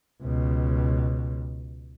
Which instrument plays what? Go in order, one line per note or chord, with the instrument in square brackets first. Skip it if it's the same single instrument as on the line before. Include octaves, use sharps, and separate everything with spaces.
[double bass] C#2 B2